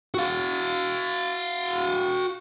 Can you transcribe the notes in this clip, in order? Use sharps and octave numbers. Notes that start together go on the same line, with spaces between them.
F#4 F5